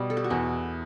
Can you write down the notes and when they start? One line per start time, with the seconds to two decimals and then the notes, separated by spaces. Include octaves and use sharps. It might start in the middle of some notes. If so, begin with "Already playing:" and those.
Already playing: B2 G3
0.10 A4
0.17 G4
0.24 F#4
0.30 E2 E4